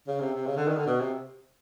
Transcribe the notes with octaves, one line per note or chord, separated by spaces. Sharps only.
C#3
C3
C3
C#3
D3
D#3
D3
B2
C3